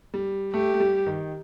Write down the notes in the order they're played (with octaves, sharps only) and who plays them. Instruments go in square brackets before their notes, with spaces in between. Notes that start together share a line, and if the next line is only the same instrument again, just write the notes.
[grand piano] G3
[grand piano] A3 [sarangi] G4
[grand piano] A3
G3
D#3